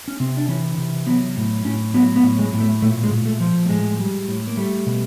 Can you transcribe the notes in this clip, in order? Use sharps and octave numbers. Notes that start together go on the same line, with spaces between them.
C#4
C3 C4
D4
E3 C#4
C3
F#3 B3
A2
A2 C#4
F#3 B3
B3
A2
G#3
A2
A3
A#2 A3
G#3
A#2
A3
F3
A3
A2 G#3
G3
A2
A#3
G3 A3
B2